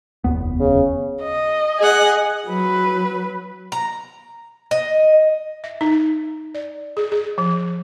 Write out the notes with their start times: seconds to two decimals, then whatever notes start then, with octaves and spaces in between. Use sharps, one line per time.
0.24 F1 D#2 B3
0.60 C#3
1.23 D#5
1.79 G#4 F#5
2.46 F#3 B4
3.72 A#5
4.71 D#5
5.64 E5
5.81 D#4
6.54 D5
6.97 G#4
7.12 G#4
7.38 F3